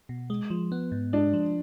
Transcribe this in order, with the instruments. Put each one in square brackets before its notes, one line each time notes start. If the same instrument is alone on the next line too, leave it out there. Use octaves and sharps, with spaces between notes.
[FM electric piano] B2
G#3
F3
B3
G#2
[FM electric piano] G#3 [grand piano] D4
[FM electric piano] F3